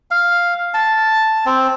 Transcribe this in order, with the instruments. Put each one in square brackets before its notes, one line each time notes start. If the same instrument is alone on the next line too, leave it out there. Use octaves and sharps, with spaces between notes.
[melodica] F5
A5
C4